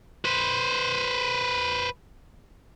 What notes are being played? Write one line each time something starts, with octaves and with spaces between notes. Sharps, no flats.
B4 C5